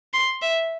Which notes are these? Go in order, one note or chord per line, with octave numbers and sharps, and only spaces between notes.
C6
E5